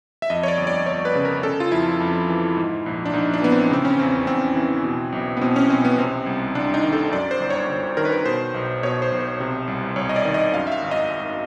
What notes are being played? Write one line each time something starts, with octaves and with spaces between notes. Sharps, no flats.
E5
F2 D#5
C#5
D5
G1
D5
G1 C#5
B4
C#3
A#4
C#3 A4
F4
F2 E4
F2
E3
G#2
A#1
D4
A#1 D#4
D4
E3 B3
C4
C#3 C4
C#4
E2 C4
E2 C4
E3
B2
B1
B3
B2 C4
C#4
B1 C4
B3
C3 C4
C2
C2 D4
D#4
D#3
A4
F#2 D5
C5
G1
C#5
G1
D#3 A#4
B4
A#4
B2 C5
B1
B2 C#5
C5
B1
C5
C3
C2
C2 C#5
D#5
D5
D#3
D#5
F#2 F5
E5
F5
G#1
D#5
G#1